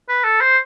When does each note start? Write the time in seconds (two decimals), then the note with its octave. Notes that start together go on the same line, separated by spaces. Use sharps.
0.09 B4
0.24 A4
0.41 C5